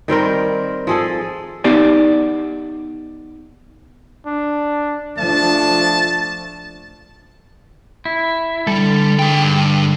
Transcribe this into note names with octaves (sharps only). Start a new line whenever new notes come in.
D#3 G3 C4 A#4
F3 G#4 A4
B3 D#4 G4 D5 G#5
D4
F3 A3 D4 A5
E4
D3 G3 A4
G#4 G5
G2